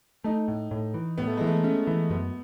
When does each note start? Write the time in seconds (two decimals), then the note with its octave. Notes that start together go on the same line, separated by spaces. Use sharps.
0.24 A3 D#4
0.48 A2
0.71 A2
0.94 E3
1.18 A2 B3
1.27 A3
1.37 E3 G#3
1.47 A3
1.64 A3 C#4
1.87 E3
2.10 F#2 B3